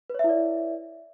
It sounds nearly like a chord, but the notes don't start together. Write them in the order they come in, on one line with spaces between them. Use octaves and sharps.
B4 C#5 E5 E4 D5